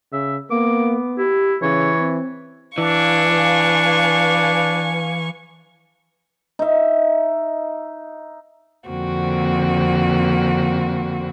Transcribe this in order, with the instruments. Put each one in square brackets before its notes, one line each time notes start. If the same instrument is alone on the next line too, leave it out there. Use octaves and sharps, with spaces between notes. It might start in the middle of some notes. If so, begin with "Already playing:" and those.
[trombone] C#3 [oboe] E5
[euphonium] A#3 [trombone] B3 [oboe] D6
[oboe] E4 [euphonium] G4
[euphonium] C#3 [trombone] E3 [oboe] C#5
[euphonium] C4
[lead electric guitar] E3 [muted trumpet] D4 [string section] B4 F5 G#5 [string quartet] C#6
[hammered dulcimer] D#4 E5
[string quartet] F2 D3 A#3 C4 F#4